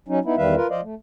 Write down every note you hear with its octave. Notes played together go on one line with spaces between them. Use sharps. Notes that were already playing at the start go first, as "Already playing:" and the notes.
F#3 C#4 D#4
B3 D#4 E4
E2 D#3 G3 B4 E5 F5
F4 A#4 B4
F3 C5 D5 D#5 F5
A3